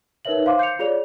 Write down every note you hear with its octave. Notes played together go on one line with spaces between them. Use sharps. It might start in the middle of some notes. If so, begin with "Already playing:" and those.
D#4 A#4 B4 C#5 E5 F#7
C5 F5 C6 D6
G6 C7 C#7 F7
F4 G#4 C#5 D5 F7